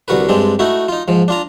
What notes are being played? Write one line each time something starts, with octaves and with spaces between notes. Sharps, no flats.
C2 D3 F#4 A#4 B4
G2 G#3 C4 D4
A3 D#4 E4 F#4
D#4 F4
G#2 F3
D4 F4 A#5